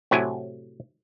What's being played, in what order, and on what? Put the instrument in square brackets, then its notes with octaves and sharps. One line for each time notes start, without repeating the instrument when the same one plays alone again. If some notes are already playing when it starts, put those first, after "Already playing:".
[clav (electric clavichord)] A2 C3 F#3 E4 G#5